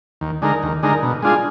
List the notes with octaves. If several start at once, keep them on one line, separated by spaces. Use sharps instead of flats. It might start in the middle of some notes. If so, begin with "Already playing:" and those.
D#2
D3 G#3 D#4 A#4
D#2
D3 G#3 D#4 A#4
B2
G#3 D4 F4 G#4